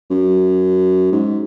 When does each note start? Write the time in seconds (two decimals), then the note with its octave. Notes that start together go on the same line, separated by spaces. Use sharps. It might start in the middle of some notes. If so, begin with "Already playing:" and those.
0.10 F#2
1.12 G#2